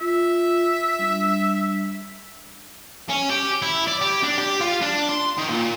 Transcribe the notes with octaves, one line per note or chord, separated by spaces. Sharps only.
F4 E5
G3 D4
C#4
G4
E4
D5
G4
D4
G4
F4
D4
C6
D#3
A#2